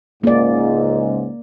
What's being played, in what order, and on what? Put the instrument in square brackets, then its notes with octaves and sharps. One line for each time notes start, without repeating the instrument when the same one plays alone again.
[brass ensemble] C#2 G#2 [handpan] A#3 D5